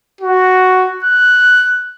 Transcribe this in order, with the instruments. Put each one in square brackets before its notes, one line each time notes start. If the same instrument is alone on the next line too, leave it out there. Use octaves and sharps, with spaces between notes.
[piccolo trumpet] F#4
F#6